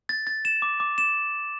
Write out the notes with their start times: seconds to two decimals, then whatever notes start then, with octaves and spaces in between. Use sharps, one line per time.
0.09 A6
0.27 A6
0.45 E7
0.62 D6
0.80 D6
0.98 E7